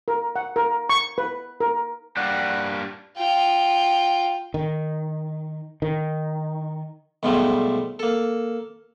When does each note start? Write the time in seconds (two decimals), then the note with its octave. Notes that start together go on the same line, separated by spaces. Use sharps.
0.08 A#4
0.36 F#5
0.56 A#4
0.89 C#6
1.18 B4
1.60 A#4
2.17 G3 A#3 D4 F#5
3.17 F4 G5
4.54 D#3
5.82 D#3
7.23 B1 G#2 B2 F3 G3 A3
7.99 A#3 A4